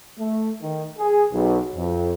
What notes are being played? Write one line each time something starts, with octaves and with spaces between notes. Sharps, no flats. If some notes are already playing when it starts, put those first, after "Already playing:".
A3
D#3
G#4
B1
F2